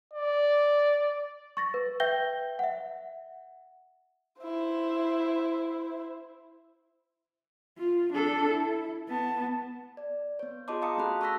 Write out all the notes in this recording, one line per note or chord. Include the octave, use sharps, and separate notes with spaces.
D5
C#6 A6 A#6
B4
B4 E5 G5 G6 A#6 G7
E5 F#5
E4 C5
F4
D4 A4
E4
B3 A5
D5
B3 C#5
F4 G#4 D#5 A5 C6 D6
F5 A5 A#5 D#6 C#7
A3 C#4 F#4 A4 B5 F#6
A5 C#6 E6 F#6 A#6 B6